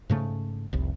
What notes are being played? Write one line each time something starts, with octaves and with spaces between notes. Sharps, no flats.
G#2 C#3 A3
F1 C2